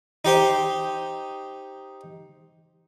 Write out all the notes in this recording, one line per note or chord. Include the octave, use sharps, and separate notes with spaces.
D#4 G4 C5